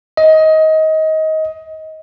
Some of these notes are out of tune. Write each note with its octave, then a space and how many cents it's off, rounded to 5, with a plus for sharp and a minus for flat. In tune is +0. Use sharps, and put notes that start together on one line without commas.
D#5 +20